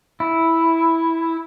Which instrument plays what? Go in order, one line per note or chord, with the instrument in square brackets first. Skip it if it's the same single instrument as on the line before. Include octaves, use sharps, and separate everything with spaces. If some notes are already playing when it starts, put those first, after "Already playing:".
[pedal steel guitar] E4